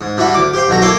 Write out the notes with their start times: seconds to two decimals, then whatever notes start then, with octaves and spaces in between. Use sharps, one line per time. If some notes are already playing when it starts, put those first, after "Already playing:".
0.01 G#2
0.17 D3 G3 E4 F#4 B5
0.34 D2 D6
0.54 G4 C5 F5
0.69 B1 D3 F#4 A#5
0.82 A#3 E4 A4 C#5 C6 D6